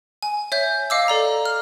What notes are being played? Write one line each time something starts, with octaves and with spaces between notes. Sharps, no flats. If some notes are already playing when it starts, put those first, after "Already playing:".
G#5
C#5 E5 G6
D#5 F5 D6 E6
A4 D5 A#5
F6